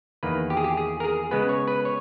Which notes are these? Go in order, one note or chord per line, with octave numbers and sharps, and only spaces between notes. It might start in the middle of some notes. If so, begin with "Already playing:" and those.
E2 D#3 A#3 B4
G4
G#4
G4
G#4
A#4
G#4
C#3 G#3 B3 B4
C#5
B4
C#5